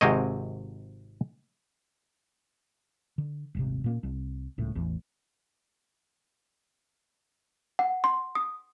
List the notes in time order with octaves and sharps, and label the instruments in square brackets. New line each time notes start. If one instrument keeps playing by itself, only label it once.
[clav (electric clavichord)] G#1 G#2 C3 C4 C#5 D#5
[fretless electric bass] D3
D#1 G#1 C3
A#2 A#3 C#4
C2
D#1 C#2 A2
A1 E2
[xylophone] F#5
C6
D#6